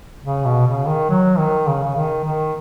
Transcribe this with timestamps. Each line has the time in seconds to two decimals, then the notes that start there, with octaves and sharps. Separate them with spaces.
0.23 C#3
0.45 B2
0.67 C#3
0.88 D#3
1.10 F#3
1.38 D#3
1.67 C#3
1.84 C#3
1.96 D#3
2.24 D#3